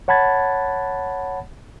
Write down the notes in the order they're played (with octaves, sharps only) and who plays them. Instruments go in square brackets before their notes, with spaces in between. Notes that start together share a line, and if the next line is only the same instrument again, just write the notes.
[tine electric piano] C#5 F#5 A5 B5 G#6 A6